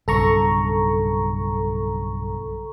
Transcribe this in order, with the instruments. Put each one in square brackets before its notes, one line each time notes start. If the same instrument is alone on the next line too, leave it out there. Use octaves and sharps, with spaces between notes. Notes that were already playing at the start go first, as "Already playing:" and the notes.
[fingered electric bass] B1 G2 C#3 [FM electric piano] A4 A#5 C#6